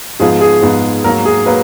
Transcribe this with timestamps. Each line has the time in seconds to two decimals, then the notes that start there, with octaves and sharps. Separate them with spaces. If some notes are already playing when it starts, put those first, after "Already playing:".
0.20 G#2 F3 B3 G#4
0.41 G#4
0.62 G#2 F3 B3
1.04 G#2 F#3 A#3 A#4
1.25 G#4
1.46 F#3 A#3 B4